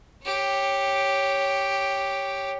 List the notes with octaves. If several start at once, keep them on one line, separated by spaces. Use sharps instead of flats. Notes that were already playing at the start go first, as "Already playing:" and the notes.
G4 C#5